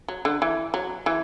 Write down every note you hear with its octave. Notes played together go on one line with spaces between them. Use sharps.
F#3
D3
E3
F#3
E3